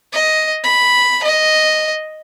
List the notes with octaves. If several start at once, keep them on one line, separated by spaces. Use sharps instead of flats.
D#5
B5
D#5